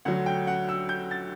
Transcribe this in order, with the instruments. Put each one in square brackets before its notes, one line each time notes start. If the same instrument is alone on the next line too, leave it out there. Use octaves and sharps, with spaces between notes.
[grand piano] D2 D3 F#3 F#5
G5
F#5
E6
G6
A6